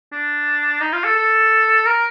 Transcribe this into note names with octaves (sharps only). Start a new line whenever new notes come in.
D4
D#4
F4
A4
A4
A#4